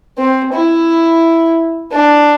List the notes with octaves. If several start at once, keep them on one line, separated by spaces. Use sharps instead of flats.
C4
E4
D4